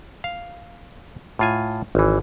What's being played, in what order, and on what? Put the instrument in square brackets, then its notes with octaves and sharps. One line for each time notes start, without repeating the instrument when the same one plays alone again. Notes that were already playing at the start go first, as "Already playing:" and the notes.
[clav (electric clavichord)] F5
A2 F4 G#5
G#1 E3